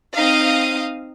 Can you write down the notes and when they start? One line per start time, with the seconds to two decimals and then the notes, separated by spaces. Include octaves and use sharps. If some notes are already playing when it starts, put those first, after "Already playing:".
0.16 C4 D#4 F5 D#6